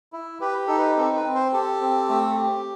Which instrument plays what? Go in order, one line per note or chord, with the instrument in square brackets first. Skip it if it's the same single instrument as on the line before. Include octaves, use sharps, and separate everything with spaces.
[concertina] E4
G4 B4
D#4 A4
B4
C4 A4
B4
C4
C5
G4 A4
C4
A3
G4